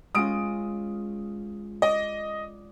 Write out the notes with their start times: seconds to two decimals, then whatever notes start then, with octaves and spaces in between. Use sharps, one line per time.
0.15 G#3 C#4 F4 D#6 D7
1.82 D5 D#5